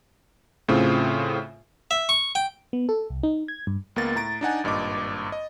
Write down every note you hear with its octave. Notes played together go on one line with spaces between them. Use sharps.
A2 C#3 C4 F4
E5
C#6
G5
B3
A4
C2
D#4
G#6
G2
C#2 A#3 B3 A#4 A6
A2 A#5 A6 D7
D4 D#4 F#5 G#5
G#1 G2 A#2 D#5 D6
D#5